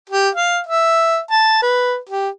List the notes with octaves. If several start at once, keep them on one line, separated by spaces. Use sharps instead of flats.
G4
F5
E5
A5
B4
G4